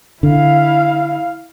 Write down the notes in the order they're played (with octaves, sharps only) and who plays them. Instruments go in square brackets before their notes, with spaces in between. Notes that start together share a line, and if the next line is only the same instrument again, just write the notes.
[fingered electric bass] D3 [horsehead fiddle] E4 F5